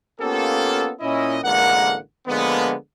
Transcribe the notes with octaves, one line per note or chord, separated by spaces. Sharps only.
A#3 B3 C#4 F4 G4 A4
A#2 C#4 E4 D#5
A1 D3 G#3 A#3 A#4 F#5
D3 F3 G#3 A#3 B3